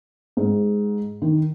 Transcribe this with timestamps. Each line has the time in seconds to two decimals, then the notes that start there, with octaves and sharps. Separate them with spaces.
0.37 G#2
1.22 D#3